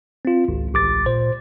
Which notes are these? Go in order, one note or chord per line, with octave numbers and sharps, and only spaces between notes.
C4 F4
G#1 C#2
A1 D6 A6
A#2 C5